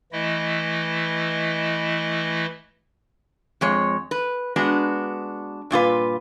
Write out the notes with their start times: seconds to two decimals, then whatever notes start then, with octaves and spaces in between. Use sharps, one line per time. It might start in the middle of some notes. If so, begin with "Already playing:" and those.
0.12 E3 A3 E4 D#5
3.61 F2 G#3 C#5
4.11 B4
4.56 G#3 B3 D4 F#4
5.71 G2 A#2 F4 B4